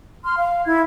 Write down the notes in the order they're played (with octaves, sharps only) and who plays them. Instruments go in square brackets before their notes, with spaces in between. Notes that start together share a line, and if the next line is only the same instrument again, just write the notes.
[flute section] C6 F6
F5
E4 G#6